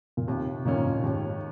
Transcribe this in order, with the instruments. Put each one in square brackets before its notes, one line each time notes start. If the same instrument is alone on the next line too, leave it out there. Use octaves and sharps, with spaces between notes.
[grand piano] A#2
[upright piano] D#2 [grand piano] C3
[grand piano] A#2 [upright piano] D#3 A#3 C#4 F4
[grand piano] G#2
A#2
[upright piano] D#2 [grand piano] G#2